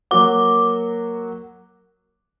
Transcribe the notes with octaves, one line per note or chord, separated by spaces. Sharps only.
F#3 A#3 F#4 D6